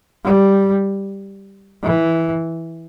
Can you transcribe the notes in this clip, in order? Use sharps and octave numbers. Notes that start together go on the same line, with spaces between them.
G3
E3